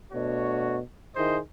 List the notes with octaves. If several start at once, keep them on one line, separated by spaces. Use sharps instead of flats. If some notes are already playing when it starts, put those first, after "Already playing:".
B2 A3 D4 F#4 C#5
D#3 E4 G#4 C5 D#5